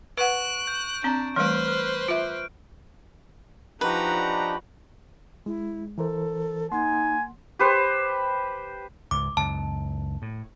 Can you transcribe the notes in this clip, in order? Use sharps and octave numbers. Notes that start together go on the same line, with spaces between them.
B4 F#5 C#6 F#6 D7
G6
C4 D4 A#5
E3 G3 A3 B4 C5 F6 F#6
F6
F4 E5 D7
F3 D4 D#4 F#4 G4 B4 A#5
G#3 E4
E3 A4 A#4 C5
A#3 D#4 F#5 G#5 C6
G4 B4 C5
C#2 G#2 D6
C#2 F#2 A5
A2